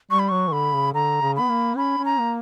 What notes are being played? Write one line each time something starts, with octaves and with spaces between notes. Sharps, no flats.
G3 C#6
B5
F#3 C#6
E3
D3 B5
C#3
D3 A#5
C#3
B3 B5
A#3
C#4 B5
C#4
A#5
A#3